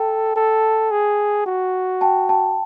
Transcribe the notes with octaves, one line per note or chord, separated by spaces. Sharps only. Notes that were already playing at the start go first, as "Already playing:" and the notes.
Already playing: A4 G5 A5
A4
G#4
F#4
G5 A5
G5 A5